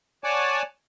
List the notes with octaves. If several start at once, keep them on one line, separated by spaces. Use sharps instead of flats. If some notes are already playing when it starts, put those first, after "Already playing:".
C#5 D5 F#5 G#5 A5 D6